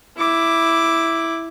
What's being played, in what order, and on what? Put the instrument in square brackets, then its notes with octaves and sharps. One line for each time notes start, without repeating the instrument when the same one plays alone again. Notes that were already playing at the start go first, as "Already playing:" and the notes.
[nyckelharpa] E4 D6